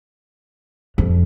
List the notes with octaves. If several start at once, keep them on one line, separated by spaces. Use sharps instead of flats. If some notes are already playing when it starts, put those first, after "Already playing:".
F2